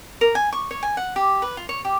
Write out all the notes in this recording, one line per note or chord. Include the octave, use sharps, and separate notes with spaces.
A#4
G#5
C#6
C#5
G#5
F#5
G4
B4
F4
C#5
G4